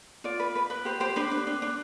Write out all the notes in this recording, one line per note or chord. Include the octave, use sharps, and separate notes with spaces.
F4 D5
B4
B4
B4
G4 C5
G4 C5
D4 B4
D4
D4
D4